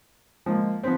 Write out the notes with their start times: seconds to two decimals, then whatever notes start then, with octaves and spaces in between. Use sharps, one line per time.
0.46 F3 G#3 A#3
0.83 F3 B3 C4 B6